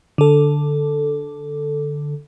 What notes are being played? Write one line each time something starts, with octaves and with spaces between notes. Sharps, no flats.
D3 A4